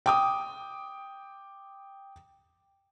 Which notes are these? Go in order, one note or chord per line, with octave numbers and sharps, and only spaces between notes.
G5 D6 D#6